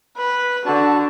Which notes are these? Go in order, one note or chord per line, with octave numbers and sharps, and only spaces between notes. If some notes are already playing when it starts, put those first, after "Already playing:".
B4
D3 F#4 A5